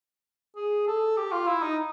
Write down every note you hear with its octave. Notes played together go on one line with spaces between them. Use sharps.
G#4
A4
G4
F4
E4
D#4